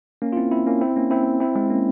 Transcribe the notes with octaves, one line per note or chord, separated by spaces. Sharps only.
A#3 C#4
F4
C4 E4
C4 E4
A#3 C#4
C4 E4
A#3 C#4
C4 E4
C4 E4
G#3 C4
A#3 C#4